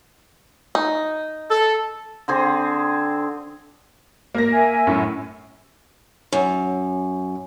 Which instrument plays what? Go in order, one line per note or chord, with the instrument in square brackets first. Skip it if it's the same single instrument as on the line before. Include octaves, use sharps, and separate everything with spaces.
[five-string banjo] D#4
[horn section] A4
[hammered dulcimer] D3 C4 G#4
[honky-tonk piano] A#3 A#4 A#6
[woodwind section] E5 G#5
[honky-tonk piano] F#2 A2
[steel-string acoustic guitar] F#2